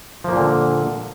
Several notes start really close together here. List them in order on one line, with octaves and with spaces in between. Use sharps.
F3 A#3 A#2 D3